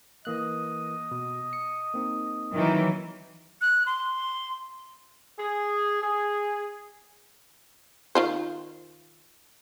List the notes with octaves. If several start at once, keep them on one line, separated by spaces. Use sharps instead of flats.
E3 A#3 D#5 F#6
B2
C#7
A#3 C4 D#4
D#3 E3 F#3
F#6
C6
G#4
G#4
D#3 F4 C5